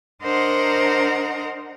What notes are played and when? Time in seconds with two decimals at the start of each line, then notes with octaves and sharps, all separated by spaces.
0.22 D4 A#4 C5 D#5 F#5 A#5